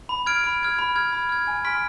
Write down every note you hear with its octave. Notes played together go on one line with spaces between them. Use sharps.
B5
F6 G#6 D7
B5
F6 G#6 D7
B5
F6 G#6
B5
F6 G#6
G#5
C6 F6 B6 D7